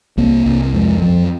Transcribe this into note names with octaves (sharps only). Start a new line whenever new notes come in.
C2 A#3
C2
F2 G#3
F2 F3